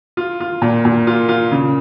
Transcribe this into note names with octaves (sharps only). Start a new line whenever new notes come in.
F4
F4
A#2
A#2
F4
F4
C#3